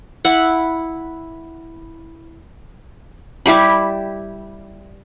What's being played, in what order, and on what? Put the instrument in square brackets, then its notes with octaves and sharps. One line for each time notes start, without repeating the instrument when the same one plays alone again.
[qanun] E4 F#5
G3 E4 G4 B5